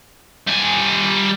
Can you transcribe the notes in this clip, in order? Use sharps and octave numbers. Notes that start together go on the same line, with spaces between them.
G3 G#5